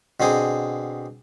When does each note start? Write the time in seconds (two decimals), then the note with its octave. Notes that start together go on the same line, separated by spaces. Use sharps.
0.20 B2 D3 C4 G#4